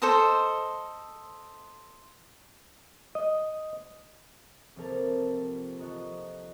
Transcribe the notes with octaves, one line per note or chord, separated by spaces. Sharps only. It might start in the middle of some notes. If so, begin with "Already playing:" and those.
A4 C5 D#5
D#5
C2 F3 A#3 C4 A4 A#4
F3 F#4 D#5 A#5